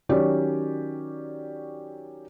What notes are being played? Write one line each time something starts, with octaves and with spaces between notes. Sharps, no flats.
D#3 F#3 C#4 G4 C#5 D5